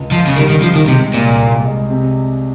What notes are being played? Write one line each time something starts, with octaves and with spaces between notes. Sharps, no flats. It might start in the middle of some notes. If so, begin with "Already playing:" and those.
Already playing: C#2
C#2 F3
C#3
D#3 G3
D#3
F3 G3
D#3
C3 G#3
C2 A#2
C2
G#3
C3